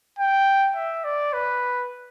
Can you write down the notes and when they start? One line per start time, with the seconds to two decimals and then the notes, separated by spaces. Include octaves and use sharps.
0.19 G5
0.76 E5
1.04 D5
1.33 B4